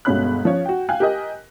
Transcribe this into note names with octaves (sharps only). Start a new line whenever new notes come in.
G1 C#2 B2 C#4 B5 F#6
F3 C#4 C#5
F#4 G5
F5 G5 G#5 F#6
G4 A#4 D#5 G#5